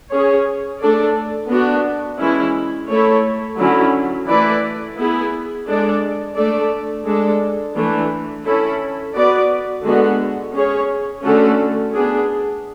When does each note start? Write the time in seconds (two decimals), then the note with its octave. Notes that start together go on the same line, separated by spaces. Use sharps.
0.11 C#4 G#4 C#5
0.80 A3 D4 A4 D5
1.50 B3 D4 F#4
2.19 E3 G#3 C#4 E4
2.89 A3 E4 A4 C#5
3.58 D3 F#3 C#4 E4
4.28 E3 A3 E4 B4 D5
4.97 B3 E4 G#4
5.67 G#3 D4 A4 D5
6.36 A3 D4 A4 D5
7.06 G#3 D4 A4
7.75 E3 A3 D4
8.45 C#4 E4 A4
9.15 B3 F#4 B4 D5
9.84 D3 G#3 B3 F#4
10.54 C#4 G#4 C#5
11.23 D3 A3 C#4 F#4 A4
11.93 B3 D4 G#4